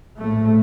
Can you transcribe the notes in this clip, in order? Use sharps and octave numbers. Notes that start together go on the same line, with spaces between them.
A#1 A2 A3